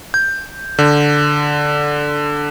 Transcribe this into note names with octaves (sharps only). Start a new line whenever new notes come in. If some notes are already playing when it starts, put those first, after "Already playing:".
G6
D3